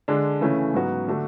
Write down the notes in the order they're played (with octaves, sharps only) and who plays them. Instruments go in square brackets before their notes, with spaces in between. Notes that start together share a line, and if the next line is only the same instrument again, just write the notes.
[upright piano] D3 G#3 D4
C#3 E3 A3 C#4
G#2 F#3 B3 F#4
D3 A3 D4 F#4